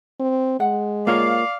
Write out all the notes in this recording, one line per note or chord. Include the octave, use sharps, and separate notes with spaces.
C4
G#3 F#5
A#3 F4 C#5 D5 F5